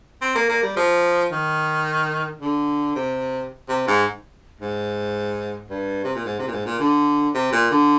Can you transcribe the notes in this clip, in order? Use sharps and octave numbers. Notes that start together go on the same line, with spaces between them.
C4
A#3
A#3
G3
F3
D#3
D3
C3
C3
G#2
G#2
G2
C3
A#2
G#2
C3
A#2
G#2
A#2
D3
C3
A#2
D3